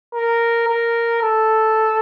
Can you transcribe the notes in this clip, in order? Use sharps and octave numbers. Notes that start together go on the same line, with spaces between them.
A#4
A#4
A4